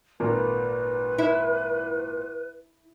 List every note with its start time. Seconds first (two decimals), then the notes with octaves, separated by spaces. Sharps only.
0.20 G#1 A#2 A#4 B4
1.19 E4